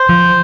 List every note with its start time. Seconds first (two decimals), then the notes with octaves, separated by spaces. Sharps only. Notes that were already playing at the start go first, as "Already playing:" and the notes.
Already playing: C5
0.09 F3